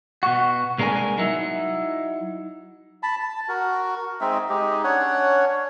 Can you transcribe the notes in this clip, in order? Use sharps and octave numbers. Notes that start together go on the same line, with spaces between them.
B2 F#4
C2 G#3 A#3 D4 A#4 G#5
F#3 D#4 E4
A5 B5
A5
F#4 A#4
G#3 C4 D#4 E5
G#3 D#4 G4
C#4 D4 C#5 F#5